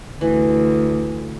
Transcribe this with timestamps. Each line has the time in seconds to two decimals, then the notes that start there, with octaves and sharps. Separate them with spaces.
0.21 D2 E3